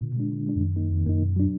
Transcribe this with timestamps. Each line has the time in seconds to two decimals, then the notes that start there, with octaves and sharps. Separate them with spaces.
0.01 A#2 D3
0.11 B2
0.16 A#2 G#3 D4
0.31 D3
0.47 G#3 D4
0.56 F2
0.61 F#2 D#3
0.76 A#3 D#4
0.91 F2 D#3
1.06 F#2 A#3 D#4
1.21 B2
1.36 F#3 D4